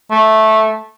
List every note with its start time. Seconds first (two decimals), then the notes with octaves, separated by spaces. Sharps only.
0.11 A3